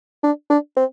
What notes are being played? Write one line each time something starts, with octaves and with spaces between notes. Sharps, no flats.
D4
D4
C4